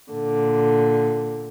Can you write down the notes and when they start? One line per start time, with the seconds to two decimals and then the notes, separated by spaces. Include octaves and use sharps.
0.11 A#2 D3